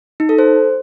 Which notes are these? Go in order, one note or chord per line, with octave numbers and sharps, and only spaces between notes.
D#4
A4
C5